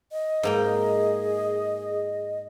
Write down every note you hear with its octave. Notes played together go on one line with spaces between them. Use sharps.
D#5
G#2 A#3 G#4 G5